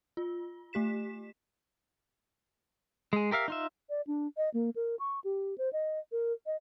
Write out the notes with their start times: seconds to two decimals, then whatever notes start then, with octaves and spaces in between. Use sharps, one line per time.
0.17 F4
0.73 A3 G4 B6 E7
3.13 G#3 G#4
3.31 G4 A#4 E5 F5
3.48 D#4 F4 E5
3.89 D5
4.07 D4
4.37 D#5
4.54 A#3
4.75 A#4
4.99 C#6
5.24 G4
5.58 C5
5.73 D#5
6.12 A#4
6.46 D#5